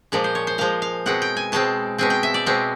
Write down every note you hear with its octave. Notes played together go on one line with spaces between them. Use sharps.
A#2 F3 G#3 D5
C5
C#5
C5
A#2 F3 G#3 F5
F5
B2 G#3 C4 F#5
G5
G#5
B2 G#3 C4 A5
B2 G#3 C4 G#5
G5
E5
D5
B2 G#3 C4